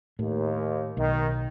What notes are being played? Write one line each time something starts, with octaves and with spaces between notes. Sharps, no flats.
D#2 A2
B1 D#3